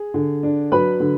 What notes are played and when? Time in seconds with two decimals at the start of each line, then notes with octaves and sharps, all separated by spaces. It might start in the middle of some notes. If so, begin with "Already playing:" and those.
Already playing: G#4
0.14 D3
0.43 D4
0.72 F#3 B4 B5
1.00 D3